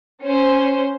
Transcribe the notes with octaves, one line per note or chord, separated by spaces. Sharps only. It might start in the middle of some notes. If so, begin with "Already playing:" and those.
C#4 C5